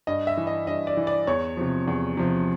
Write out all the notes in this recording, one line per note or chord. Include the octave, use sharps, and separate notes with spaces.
G2 D#5
E5
E3
D#5
G2 D#5
D5
E3
D5
E2 C#5
C3 F3
E2
C3 F3